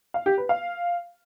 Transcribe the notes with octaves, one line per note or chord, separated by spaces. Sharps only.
F5
G4
B4
F5